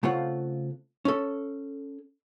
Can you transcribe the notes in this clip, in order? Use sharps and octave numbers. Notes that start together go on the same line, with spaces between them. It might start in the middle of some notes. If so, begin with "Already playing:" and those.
C#3 A3 C4 F4 F#5
C#4 A4